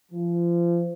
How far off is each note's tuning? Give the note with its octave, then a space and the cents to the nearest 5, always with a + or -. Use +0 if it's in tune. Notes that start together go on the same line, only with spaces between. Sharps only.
F3 -30